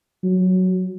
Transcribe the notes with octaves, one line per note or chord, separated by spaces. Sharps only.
F#3